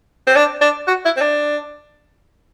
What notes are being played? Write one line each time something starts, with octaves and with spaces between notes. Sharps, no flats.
C4
D4
D4
F#4
E4
C4
D4